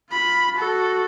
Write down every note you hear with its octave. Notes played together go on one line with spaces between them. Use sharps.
F4 B5
F#4 A4